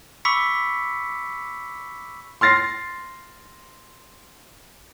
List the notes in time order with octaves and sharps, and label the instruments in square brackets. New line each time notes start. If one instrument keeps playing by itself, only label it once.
[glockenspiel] B5 C#6 D6 E6 B6 C#7
[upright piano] C6 F6 A6 A#6 C7